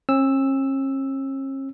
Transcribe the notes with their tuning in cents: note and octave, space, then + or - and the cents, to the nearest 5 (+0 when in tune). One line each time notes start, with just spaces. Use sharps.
C#4 -45 E6 +0